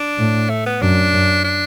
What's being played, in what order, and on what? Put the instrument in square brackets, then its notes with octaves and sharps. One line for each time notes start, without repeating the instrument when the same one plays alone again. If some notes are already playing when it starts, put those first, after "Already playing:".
Already playing: [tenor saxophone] D4
[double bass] A2
[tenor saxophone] A3
B3
[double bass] F#2 [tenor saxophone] D4
[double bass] F#2
[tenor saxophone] D4